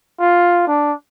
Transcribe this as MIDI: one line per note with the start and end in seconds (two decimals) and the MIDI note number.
0.19 0.64 65
0.67 0.93 62